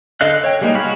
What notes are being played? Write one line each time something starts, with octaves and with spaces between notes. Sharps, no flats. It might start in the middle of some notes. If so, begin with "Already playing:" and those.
D3 A4 D#5 F5 F#6
C#5 G5
G3 G#3 A#3 D#4
F#4 G#4 F5 F#5 B5